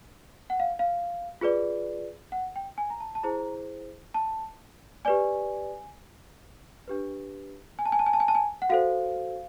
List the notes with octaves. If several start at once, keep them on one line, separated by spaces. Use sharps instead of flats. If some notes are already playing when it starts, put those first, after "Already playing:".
F#5
F5
F5
F4 G#4 B4 D5
F#5
G5
G#5
A#5
A5
A5
E4 G#4 C5 A#5
A5
G4 B4 D5 G#5
D4 G4 B4
G#5
A5
G#5
A5
G#5
A5
G#5
A5
G#5
F#5
F#4 A4 C5 F5